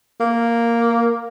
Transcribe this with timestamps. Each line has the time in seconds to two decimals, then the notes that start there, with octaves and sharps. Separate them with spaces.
0.20 A#3